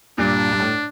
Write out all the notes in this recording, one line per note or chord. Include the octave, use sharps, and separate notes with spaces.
G2 A#2 D4
G2
A2